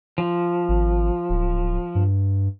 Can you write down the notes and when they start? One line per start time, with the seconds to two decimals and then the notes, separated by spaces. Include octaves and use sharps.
0.18 F3
0.69 G#1
1.29 D1
1.95 G2